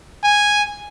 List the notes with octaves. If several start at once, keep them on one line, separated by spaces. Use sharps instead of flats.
G#5